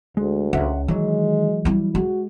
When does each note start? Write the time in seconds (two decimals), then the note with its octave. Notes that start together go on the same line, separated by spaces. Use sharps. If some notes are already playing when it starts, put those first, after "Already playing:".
0.17 D2 G#3
0.53 C#2 E5 F#5
0.88 D#3 E3 F#3 G#3
1.65 G3 E4
1.95 G#3 F#4